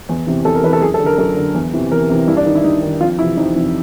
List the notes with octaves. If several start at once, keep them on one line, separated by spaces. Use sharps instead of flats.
E2
C3 E3
E2 A4
A#4
C3 E3 B4
A4
F#2 G#4
A4
D3
A#4
F#2 A4
D3
E2
C3 E3
E2 A#4
C3 E3
G2 E4
D4
D#3 D#4
E4
G2 D#4
D#3
F2 F4
C3 E3 E4
F2 D#4
C3 E3